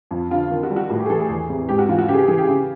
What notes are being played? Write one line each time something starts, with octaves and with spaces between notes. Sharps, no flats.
F2
D3 F4
D#3
F#4
G3
F#4
A2 F#4
G4
G#4
E3 A4
G#4
E2
C3
G#2 G4
F#4
E3 F4
F#4
C#3 G4
G#4
G4
E3 G#4
G4
C#3